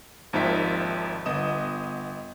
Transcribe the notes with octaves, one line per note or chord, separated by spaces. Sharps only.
G#1 D#2 F3 D#4 E5 B6
G1 B3 D#5 D#6 E7